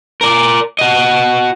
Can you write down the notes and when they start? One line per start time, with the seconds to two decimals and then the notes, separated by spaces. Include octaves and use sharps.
0.21 A#4 D5
0.79 F#4 D#5